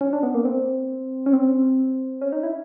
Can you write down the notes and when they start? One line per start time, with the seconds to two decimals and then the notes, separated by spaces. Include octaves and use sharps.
0.01 C#4
0.13 D4
0.23 B3
0.34 A#3
0.45 C4
1.26 C#4
1.33 C4
2.21 C#4
2.32 D#4
2.43 E4